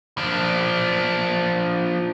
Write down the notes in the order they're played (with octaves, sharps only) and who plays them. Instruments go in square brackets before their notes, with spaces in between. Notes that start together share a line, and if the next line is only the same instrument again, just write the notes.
[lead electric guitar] F3 D4